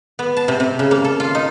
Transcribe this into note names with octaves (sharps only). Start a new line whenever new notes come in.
B3
A5
C3
C3
C#3
A#3
A4
F4
D#4